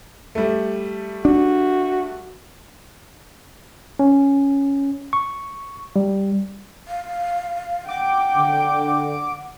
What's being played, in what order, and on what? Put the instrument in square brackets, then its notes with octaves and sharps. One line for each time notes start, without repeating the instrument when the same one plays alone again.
[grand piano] G3 A3
[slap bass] D4 [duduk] F#4
[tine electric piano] C#4
C#6
G3
[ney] F5
[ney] F#5 [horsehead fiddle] G5 [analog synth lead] D6
[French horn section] D3